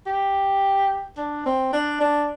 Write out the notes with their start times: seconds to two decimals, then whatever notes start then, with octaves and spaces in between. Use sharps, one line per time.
0.06 G4
1.17 D4
1.45 C4
1.73 D4
2.01 D4